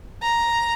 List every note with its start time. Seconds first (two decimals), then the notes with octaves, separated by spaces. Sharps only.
0.22 A#5